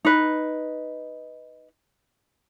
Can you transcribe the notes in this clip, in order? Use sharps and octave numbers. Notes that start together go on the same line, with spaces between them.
D#4 B4